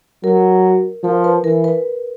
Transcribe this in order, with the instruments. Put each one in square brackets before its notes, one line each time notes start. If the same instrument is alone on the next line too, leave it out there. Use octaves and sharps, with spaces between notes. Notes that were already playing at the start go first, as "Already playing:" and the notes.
[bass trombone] F#3 [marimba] A#4
[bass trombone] F3 [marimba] A#4
[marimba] B4
[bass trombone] E3 [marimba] A#4
[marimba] B4